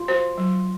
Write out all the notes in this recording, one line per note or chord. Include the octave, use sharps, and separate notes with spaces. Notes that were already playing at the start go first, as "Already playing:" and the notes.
Already playing: F4
F#4 C5
F#3